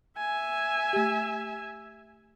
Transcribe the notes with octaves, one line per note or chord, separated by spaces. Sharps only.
E5 G#5
A3 G4